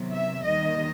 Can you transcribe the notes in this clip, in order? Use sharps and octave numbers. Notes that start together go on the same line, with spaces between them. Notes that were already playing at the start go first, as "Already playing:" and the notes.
Already playing: C3 D#3 F#3 B3
E5
D#2 D#3 G3 D#5